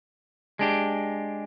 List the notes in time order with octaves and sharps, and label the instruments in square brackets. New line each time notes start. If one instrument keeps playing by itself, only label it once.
[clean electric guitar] G#3 D4 G4